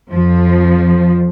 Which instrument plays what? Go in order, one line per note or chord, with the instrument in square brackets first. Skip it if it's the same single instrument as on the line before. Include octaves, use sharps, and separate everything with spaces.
[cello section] F2 F3